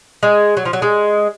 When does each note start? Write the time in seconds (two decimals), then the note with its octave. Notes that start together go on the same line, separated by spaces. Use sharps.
0.23 G#3
0.57 F#3
0.65 F3
0.73 F#3
0.82 G#3